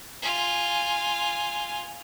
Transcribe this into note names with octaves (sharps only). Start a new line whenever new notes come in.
F4 G#5